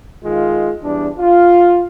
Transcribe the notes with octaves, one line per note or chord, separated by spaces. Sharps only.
D#3 G#3 F4
E2 G3 D4
F4